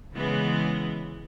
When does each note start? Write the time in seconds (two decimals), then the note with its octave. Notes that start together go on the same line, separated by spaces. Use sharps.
0.12 C#3 E3 G#3 B3